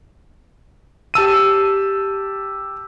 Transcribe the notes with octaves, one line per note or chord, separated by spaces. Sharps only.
G4 A5 E6 D#7